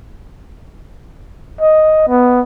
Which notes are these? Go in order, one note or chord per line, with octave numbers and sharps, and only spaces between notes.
D#5
B3